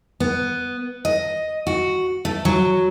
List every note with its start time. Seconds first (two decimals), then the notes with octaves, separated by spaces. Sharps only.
0.20 B3
1.05 D#5
1.67 F#4
2.25 A3
2.45 F#3